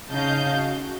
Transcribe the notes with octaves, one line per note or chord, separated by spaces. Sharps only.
C#3 D#4 D#5 F5 A5 G6
F#4